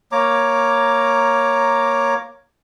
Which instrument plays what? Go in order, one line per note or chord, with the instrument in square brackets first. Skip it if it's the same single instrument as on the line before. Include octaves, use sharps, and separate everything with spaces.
[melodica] A#3 C#5 A#5 D6